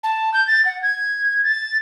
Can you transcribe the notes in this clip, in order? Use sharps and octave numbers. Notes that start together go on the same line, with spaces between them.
A5
G6
A6
F#5
G#6
A6